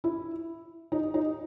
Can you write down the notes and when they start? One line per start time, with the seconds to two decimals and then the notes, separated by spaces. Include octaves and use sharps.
0.04 E4
0.92 D#4
1.14 D#4